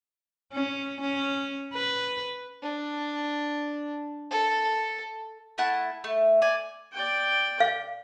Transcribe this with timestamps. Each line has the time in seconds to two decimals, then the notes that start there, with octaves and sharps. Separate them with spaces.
0.53 C#4
1.01 C#4
1.73 B4
2.62 D4
4.31 A4
5.58 A3 E4 F#5 A5
6.04 A3
6.42 D5 G#5
6.92 D5 G5
7.60 F5